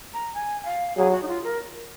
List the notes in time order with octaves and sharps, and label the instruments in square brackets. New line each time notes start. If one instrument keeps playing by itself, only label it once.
[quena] A#5
G#5
F5
[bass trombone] F#3 [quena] G#4
[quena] F#4
D#4
F4
A#4